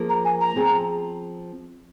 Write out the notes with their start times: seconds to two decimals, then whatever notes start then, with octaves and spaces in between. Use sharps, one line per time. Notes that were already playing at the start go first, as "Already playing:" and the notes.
Already playing: F3 A#3 G#4 C5
0.09 A#5
0.25 G#5
0.41 A#5
0.56 F3 C4 G#4